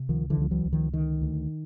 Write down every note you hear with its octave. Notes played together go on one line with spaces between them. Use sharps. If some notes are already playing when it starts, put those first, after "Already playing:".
Already playing: C3
C#2 D#3 F3
D3 E3
C#2 F3
E3 F#3
C#2
D#3 F3
D3 D#3
D2